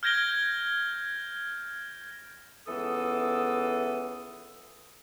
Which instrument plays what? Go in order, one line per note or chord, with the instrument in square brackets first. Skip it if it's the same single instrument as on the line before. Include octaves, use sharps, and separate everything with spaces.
[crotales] F6 G6 G#6 A#6 D7 G7
[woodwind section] C#2 E3 B3 A4 D#6 E6